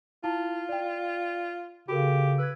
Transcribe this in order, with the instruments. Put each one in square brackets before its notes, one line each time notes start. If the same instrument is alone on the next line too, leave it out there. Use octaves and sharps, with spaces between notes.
[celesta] E4 A5 [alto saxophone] F4
[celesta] D5 G5
[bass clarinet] C#3 [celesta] F#4 A4 A#4 [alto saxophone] G4
[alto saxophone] B4 [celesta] E6 F#6 G#6